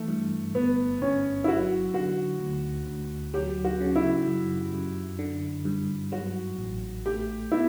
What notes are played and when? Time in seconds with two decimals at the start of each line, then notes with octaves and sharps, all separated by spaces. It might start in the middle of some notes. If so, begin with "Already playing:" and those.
Already playing: E3 A3
0.08 G2
0.55 G1 B3
1.01 G1 C#4
1.44 E4
1.48 F#3 F#4
1.94 D3 F#4
2.40 D2
2.87 D2
3.34 F#3 G4
3.64 F#4
3.81 C#3
3.96 E4
4.27 F#2
4.74 F#2
5.19 D3
5.65 G2
6.12 F#3 F#4
6.58 A1
7.06 A3 G4
7.52 B2 E4